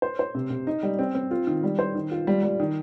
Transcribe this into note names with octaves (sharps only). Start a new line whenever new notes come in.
C5
C5
C3
C3
D#4
G3
C4
C4
F4
D#3
G3
C5
D#3
F4
G3
G3
D#3